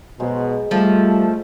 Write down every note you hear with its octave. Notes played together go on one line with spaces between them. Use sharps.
B2 F#3 G#3 C5
F3 G3 A3 F4